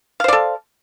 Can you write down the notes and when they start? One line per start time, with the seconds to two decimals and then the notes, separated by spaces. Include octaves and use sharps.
0.20 F5
0.24 C5
0.28 D5
0.33 A4